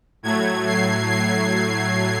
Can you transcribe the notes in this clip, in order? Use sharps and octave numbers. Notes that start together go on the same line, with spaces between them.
A2 F#3 A3 G#6
C7
C7